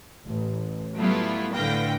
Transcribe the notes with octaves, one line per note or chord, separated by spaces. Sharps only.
A1
F#3 G3 A3 B3 E4 F4
A2 D3 B4 F5 G5 A#6